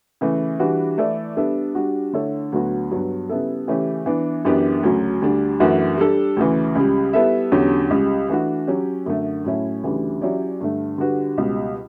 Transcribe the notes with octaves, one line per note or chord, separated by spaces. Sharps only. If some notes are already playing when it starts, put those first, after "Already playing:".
C#3 E3 A3
E3 G3 D4 F#4 B4
E3 A3 E4 A4 D5
G3 B3 D4 A4 E5
G3 D4 F#4
D3 A3 E4 A4 C#5
D2 D3 F#3 B3 F#4
G2 F#3 B3
C#3 G3 B3 E4 A4
C#3 E3 A3 C#4 G4
E3 B3 D4
F#2 E3 B3 D4 G4
D2 C#3 F#3
D2 D3 G3 D4
F#2 E3 A3 D4 F#4
G3 D4 A4
D2 C#3 E3
C#2 C#3 G3
G3 B3 E4 A4 E5
E2 D3 F#3 C#4 G4
C#2 C#3 G3
E3 A3 D4 F#4
F#3 C#4 G4
F#2 D3 A3
A2 F#3 C#4 E4
D2 C#3 E3 G3 D4
F#3 C#4 E4 G4 D5
G2 D3 A3
D3 G3 D4 F#4 B4
C#2 B2 G3